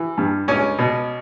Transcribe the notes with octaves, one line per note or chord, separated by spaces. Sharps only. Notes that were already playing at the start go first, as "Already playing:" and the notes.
Already playing: E3
G2
C#2 C#4
B2